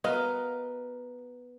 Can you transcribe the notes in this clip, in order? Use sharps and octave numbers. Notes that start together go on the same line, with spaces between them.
B3 F#4 A#4 D#5 F5